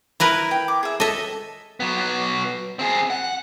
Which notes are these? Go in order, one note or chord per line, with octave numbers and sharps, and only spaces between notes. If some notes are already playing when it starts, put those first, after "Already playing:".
E4 A#4 B4
G5
D6
G#4 E5
A4 D#5 E5
F#3 B3
C4 G#4
F#5